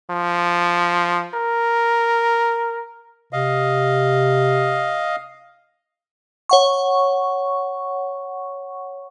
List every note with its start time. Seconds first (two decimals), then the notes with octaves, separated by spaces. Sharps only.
0.10 F3
1.34 A#4
3.33 C3 D#5 F5
6.49 C#5 F#5 C#6